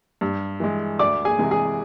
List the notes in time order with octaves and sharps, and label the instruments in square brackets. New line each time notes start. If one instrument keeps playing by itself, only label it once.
[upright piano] G2
E3 G#3
D2 D5 D6
G#4 G#5
C3 E3 G#3
G#4 G#5